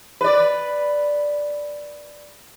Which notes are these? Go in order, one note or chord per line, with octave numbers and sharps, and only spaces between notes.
B4 D5